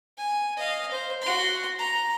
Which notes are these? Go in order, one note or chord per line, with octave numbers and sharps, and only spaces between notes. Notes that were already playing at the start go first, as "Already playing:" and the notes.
G#5
D#5 F5
C5
F#4 C6
A#5